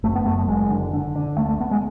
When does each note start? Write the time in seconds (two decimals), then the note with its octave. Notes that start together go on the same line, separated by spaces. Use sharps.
0.03 F#1 A3
0.15 B3
0.26 F#2 A3
0.48 F#1 G#3
0.70 D3
0.93 D3
1.15 D3
1.38 D2 A3
1.49 A3
1.60 D2 B3
1.71 G#3